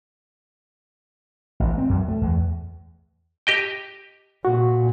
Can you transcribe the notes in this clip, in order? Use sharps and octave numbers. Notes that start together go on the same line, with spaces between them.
A1
C4
F#2
A3
E2
G4 D#5 G5
A#2 F#4